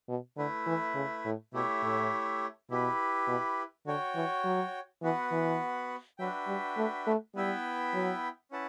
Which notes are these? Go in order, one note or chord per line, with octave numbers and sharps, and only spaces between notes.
B2
D3 A3 E4 B4 E5
E3
C#3
A2
B2 A3 E4 G4 C#5 E5
A2
B2 E4 G4 B4
B2
D3 F#4 C#5 G5
E3
F#3
E3 B3 F#4 B4 F#5
E3
F#3 D4 F#4 B4 E5 G5
G3
A3
A3
G3 B3 E4 B4 E5 G5
F#3
C#4 E4 B4 F#5 A5